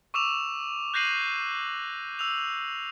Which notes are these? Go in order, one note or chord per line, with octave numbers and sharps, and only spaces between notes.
C#6 D6 E6 E7 F7
F#6 G6 A#6 C7 D#7 F#7
E6 F7